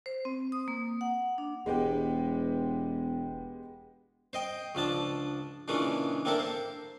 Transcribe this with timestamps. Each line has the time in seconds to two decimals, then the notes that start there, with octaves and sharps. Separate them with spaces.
0.06 C5
0.25 C4
0.52 D#6
0.68 A#3
1.01 F#5
1.38 D4
1.66 E1 G#3 B3 G4
4.33 C5 D#5 G5
4.75 C#2 F3 D4 A5
5.68 A#2 C#3 E3 G#3 C#4 D4
6.25 A#3 C4 D4 A4 A#4 E5
6.39 C5